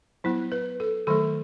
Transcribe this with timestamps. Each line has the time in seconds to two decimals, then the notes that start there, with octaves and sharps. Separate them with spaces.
0.24 F#3 B3 E4
0.52 B4
0.80 A4
1.07 D#3 F#3 A3 A4